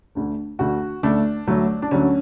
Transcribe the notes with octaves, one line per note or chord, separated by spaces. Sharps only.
D2 D3 A3
D2 D3 A3 F#4
D2 D3 A3 D4
D2 D3 F#3 A3
D4
D2 D3 F#3 A3 C#4